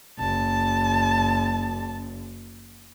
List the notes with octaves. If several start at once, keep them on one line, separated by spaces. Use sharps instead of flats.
F#1 A5